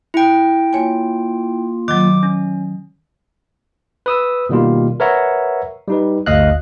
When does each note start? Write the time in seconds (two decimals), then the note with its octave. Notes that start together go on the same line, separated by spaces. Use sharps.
0.14 E4 G5
0.73 A#3 F4 C#5 G#5
1.88 D#3 F#3 D6
2.23 C#4
4.06 B4 D#6 E6
4.49 B2 D#3 G3 A#3 F4
5.00 A#4 B4 C#5 E5 F#5 A#5
5.88 G3 D#4 B4
6.26 G1 D2 D#5 F5 F#6